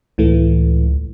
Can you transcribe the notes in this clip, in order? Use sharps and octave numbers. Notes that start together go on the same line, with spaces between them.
C#2 A2 E3 A3